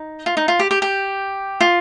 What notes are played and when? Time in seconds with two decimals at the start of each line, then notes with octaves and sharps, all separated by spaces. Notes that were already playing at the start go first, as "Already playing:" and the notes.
Already playing: D#4
0.26 F4
0.37 D#4
0.48 F4
0.59 G4
0.71 G4
0.82 G4
1.61 F4